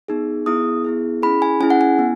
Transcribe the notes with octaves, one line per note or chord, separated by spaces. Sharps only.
B3 D#4 G#4
B3 E4 G#4 D#6
B3 E4 G#4
C#4 E4 G#4 B5
G#5
C#4 E4 G#4 G#5
F#5
G#5
B3 E4